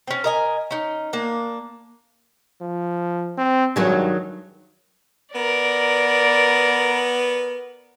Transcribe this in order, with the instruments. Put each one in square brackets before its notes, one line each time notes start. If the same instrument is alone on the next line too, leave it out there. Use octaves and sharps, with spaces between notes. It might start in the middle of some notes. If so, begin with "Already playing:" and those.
[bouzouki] C4 C#4
A#4 D#5 G#5
C#4 D#4
A#3 D4
[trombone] F3
C4
[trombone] G2 [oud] D#3 F#3 G#3
[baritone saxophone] B3 [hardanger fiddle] A#4 D5